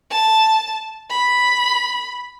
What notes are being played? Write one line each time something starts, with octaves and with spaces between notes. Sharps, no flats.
A5
B5